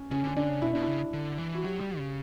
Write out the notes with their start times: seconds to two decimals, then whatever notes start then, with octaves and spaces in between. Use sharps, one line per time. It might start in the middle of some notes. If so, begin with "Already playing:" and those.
Already playing: C#4
0.11 C#3 C#4
0.24 D3 C#4
0.36 D3 D4
0.49 C#3
0.62 B2 E4
0.73 B2 D4
0.83 C#3 E4
1.13 D3
1.38 E3
1.54 F#4
1.63 F#3 G4
1.80 G3
1.98 C#3